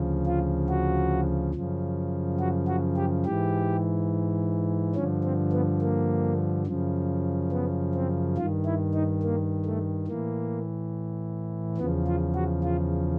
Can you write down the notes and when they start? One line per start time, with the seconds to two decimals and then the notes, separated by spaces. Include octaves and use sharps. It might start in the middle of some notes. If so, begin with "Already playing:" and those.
Already playing: D2 C#3 F3
0.26 F4
0.69 F#4
1.55 F#2 C#3 F3
2.40 F#4
2.68 F#4
2.97 G4
3.25 G#2 E3 G4
4.96 G2 D3 F3 C#4
5.24 C4
5.53 B3
5.81 A#3
6.66 F#2 C#3 F3
7.52 B3
7.95 C4
8.37 G2 D#3 F4
8.65 E4
8.94 D#4
9.22 A#3
9.65 A3
10.07 A2 E3 A#3
11.78 E2 C#3 F3 B3
12.07 F4
12.35 F#4
12.64 F4